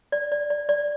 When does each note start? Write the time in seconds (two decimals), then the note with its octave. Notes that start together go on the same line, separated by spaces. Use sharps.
0.12 D5
0.32 D5
0.50 D5
0.69 D5